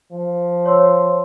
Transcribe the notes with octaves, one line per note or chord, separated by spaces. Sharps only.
F3
C#5 C6 E6